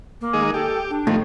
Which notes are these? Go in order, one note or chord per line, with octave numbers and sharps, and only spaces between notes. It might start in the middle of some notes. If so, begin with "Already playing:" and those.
A#3
D#3 G#3 G#4
G4 A4
D4
A2 D#3 F3